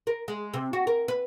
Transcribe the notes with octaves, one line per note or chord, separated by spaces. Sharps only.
A#4
G#3
C3
F#4
A#4
B4